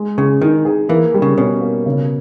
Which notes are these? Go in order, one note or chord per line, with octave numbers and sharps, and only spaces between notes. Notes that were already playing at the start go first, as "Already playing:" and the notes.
Already playing: G#3
C#3 G#4
D#3 D#4
G#4
E3 A#3
G3
C#3
B2 C#4
A#3
C#3